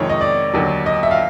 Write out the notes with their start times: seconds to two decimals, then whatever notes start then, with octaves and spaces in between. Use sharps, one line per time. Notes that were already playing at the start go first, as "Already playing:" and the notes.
Already playing: F2 C3 D#3 G#3 C#5
0.09 D#5
0.21 D5
0.53 D#2 D3 F#3
0.86 D#5
1.03 E5
1.11 F5